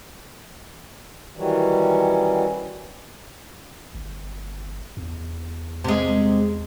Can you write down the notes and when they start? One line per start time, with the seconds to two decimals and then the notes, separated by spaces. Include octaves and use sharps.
1.37 D#3 E3 F#3 G3 C#4
3.95 G1
4.97 E2
5.84 C3 G#3